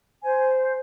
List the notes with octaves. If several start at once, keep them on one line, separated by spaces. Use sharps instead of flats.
C5 G#5